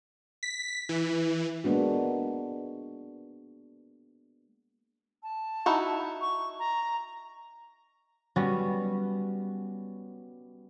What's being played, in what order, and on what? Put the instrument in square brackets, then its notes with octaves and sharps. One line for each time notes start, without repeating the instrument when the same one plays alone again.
[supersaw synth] B6
E3
[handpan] G#3 A#3 B3 D4 F#4
[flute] A5
[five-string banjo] D#4 E4 F#4
[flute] C#6
A#5
[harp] G3 B3 C#4 F#4